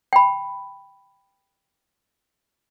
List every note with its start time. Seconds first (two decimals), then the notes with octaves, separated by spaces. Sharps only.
0.13 G5 B5